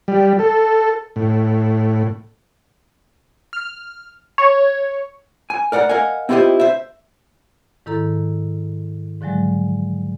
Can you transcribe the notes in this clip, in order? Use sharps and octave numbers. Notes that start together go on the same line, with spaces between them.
G3
A4
A2
F6
C#5
G#5
A#4 D5 F#5 G5 A#5
A#4 D#5 F5 F#5 G#5
C4 E4 F4 G4 C5 D#5
C5 E5
G#2 D#3 E4 A4 A#5
G#2 D3 F3 F#3 G#3